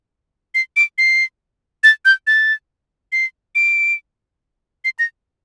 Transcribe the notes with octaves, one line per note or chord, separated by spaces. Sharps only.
C7
D7
C7
A6
G6
A6
C7
D7
C7
A#6